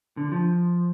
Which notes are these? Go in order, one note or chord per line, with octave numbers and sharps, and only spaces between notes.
D3
F3